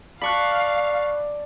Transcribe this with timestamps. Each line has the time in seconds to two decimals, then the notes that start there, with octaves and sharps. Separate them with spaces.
0.22 D5 F5 A5 B5 C#6 F#6